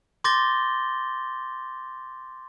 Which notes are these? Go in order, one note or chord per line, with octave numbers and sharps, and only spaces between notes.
C6 D6 G6 A6 A#6 G7